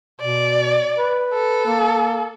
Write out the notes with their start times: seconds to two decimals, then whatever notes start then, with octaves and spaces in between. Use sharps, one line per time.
0.21 B2 D5
0.97 B4
1.34 A4
1.66 A#3